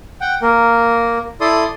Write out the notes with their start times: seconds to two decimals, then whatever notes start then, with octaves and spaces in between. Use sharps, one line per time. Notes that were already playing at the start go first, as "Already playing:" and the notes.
0.21 F#5 G5
0.42 A#3 A#4
1.41 E4 A4 D5 C6 D#6